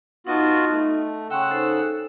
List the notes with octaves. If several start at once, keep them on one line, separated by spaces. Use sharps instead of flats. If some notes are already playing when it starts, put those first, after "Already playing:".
B3 D#4 F4 F#4 D#5 A5
A3
C#3 F#5 G5 C6 C#6 E6
D#4 A4 C5